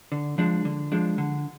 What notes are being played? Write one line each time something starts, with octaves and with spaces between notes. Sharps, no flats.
D3
F3 G#3 D4
D3
F3 G#3 D4
D3